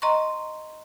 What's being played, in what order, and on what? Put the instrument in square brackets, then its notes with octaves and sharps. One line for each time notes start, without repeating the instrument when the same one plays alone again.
[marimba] D#5 A#5 C6 C#6